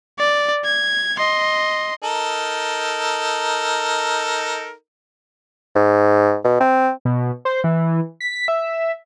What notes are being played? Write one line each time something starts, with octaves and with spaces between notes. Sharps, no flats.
D5
G#6
D#5 C6
D#4 A4 A#4
G#2
B2
C4
B2
C5
E3
B6
E5